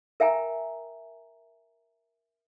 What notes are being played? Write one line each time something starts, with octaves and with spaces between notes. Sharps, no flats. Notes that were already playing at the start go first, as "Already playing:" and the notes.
A#4 E5 G5 G#5 A#5